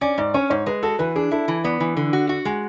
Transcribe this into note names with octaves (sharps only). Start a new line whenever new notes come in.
C#4 D5
G#2 D5
C#4 C#5
G#2 C#5
G#3 B4
F#4 A4
E3 B4
D4 G#4
E4 A4
E3
B3 D5
E3
D3
F#4
F#4 F#5
G#3 F#5